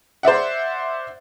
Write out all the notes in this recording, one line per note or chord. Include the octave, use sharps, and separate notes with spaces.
C5 D5 E5 F#5